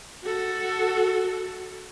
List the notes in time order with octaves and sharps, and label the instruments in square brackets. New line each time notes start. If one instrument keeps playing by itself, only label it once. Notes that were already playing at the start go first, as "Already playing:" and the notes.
[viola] F#4 A4